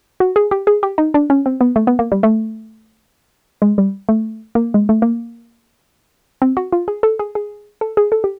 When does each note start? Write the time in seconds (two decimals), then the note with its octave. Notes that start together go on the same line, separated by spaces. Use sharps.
0.20 F#4
0.36 G#4
0.51 G4
0.67 G#4
0.83 G4
0.98 D#4
1.14 D4
1.30 C#4
1.46 C4
1.61 B3
1.76 A3
1.87 B3
1.99 A#3
2.12 G3
2.23 A3
3.62 G#3
3.78 G3
4.09 A3
4.55 A#3
4.74 G#3
4.89 A3
5.02 A#3
6.42 C4
6.57 F#4
6.72 F4
6.88 G#4
7.03 A4
7.19 G#4
7.35 G#4
7.81 A4
7.97 G#4
8.12 A4
8.24 G4